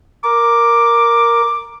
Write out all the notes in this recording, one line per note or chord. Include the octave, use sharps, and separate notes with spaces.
A#4 D6